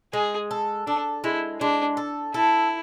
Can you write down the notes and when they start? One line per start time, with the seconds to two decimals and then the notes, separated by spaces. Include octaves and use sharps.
0.13 G#3 G#4
0.51 A4
0.87 D4 A4
1.24 G#3 E4
1.61 G#3 D4
1.97 A4
2.34 E4 A4